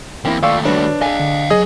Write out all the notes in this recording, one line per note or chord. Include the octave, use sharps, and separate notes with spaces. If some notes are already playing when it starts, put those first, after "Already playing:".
E2 A#3 C4 E4
D#2 A3 F4 D5 F5 G5 C#6 E6
G3 D4 F#4 B4 C#5
G#4 D#5 F5 G#5
D3
F#3 G#4 D#5